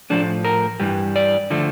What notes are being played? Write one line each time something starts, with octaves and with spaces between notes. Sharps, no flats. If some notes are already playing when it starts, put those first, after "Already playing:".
A2 F3 A3 D4
A#4
G2 E3 G3
D5
D3 F3 A3